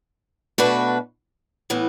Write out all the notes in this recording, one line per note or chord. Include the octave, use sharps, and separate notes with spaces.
B2 A3 D4 F#4 B4
A2 E3 B3